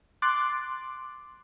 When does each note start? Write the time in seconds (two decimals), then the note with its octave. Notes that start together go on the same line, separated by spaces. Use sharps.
0.22 C6 D6 F#6 A6